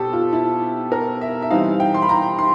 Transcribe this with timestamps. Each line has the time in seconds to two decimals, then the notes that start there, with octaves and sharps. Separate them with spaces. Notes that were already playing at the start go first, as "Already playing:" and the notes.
Already playing: B2 C4 G4 A4
0.13 F4
0.33 E4
0.92 A#4
1.21 E5
1.42 E5
1.50 E3 G3 C4 D#4 F5
1.80 G5
1.94 C6
2.02 B5
2.09 A#5
2.39 C6